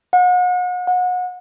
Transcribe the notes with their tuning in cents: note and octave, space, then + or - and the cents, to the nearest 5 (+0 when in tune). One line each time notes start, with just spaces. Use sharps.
F#5 -40
F#5 -30